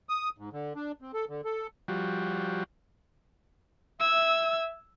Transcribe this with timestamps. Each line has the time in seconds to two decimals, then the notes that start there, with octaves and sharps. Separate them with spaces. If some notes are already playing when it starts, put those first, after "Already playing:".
0.09 D#6
0.38 G#2
0.53 D3
0.75 D4
1.02 C4
1.14 A4
1.29 D3
1.44 A4
1.88 F3 G3 F#4
4.00 E5 E6 G#6